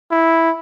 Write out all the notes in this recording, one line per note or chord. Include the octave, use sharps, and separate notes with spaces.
E4